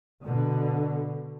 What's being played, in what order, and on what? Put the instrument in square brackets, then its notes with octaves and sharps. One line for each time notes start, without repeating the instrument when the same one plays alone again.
[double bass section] B2 D3